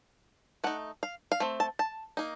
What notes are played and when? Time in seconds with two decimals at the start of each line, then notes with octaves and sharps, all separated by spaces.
0.64 A3 D#4 F#5
1.03 F5
1.32 F5
1.40 A3 C4
1.60 A5
1.79 A5
2.17 A#3 D#4